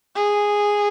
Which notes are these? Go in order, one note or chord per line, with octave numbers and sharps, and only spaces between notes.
G#4